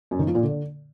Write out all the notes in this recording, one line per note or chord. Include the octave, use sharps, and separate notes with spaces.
F#2
D#3
F3
A#2
D3